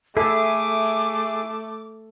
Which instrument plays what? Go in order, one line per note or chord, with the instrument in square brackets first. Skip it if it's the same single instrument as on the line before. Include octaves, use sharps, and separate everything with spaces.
[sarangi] A3 [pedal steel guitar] E4 G#4 [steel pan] A4 [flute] D6